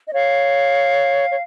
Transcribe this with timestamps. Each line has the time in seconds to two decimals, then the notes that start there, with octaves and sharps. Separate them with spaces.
0.09 D#5
0.13 C#5 F5
1.31 C#5